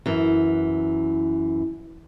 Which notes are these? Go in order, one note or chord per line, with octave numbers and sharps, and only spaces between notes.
F#2 E3